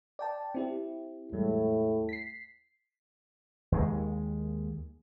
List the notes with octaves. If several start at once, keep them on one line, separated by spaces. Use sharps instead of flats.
D5 G5 A5
C4 E4 G4
E2 A2 G3 G#3
B6 C7
D#2 G#3